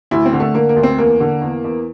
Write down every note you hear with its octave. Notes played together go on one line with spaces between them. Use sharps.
D2 E4
C4
D3
A3
D3 A#3
A#3
D2
C4
E2 A#3
D3
E2
E2